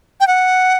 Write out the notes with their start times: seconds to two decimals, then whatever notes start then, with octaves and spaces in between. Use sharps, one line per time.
0.20 G5
0.28 F#5